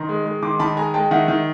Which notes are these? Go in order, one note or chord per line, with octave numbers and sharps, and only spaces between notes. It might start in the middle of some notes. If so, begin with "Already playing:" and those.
Already playing: D#3 A#5 C6
G#3
G#3
D#3 C6 D6
D#3 A5 B5
G#3 G#5 A#5
G#3 G5 A5
D#3 E5 F#5
D#3